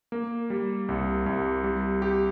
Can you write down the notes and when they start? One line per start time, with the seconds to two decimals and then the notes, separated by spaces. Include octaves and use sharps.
0.12 A#3
0.50 G3
0.89 C2
1.26 C2
1.64 G3
2.02 G4